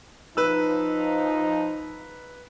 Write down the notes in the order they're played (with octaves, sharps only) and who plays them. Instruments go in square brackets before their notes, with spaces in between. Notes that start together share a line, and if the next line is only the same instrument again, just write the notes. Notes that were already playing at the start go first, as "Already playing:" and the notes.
[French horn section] F3 D#4 [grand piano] B4 E6